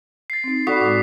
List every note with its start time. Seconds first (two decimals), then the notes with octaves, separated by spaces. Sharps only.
0.30 A6 C7
0.44 C4 D#4
0.67 F#4 A4 D5 B5 D#6 B6 C7
0.80 A2 G#3 D6 D#6